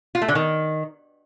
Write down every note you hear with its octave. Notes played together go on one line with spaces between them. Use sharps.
F4
A3
D3
D#3